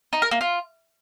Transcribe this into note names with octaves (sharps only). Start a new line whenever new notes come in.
D#4
A#4
A#3
F4